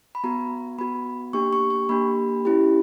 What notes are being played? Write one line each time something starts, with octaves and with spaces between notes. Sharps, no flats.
B5
B3 F#4 A#5
B3 F#4 B5
A#3 D4 G4 C#6
C#6
C#6
A#3 D4 G4 B5
C#4 E4 G4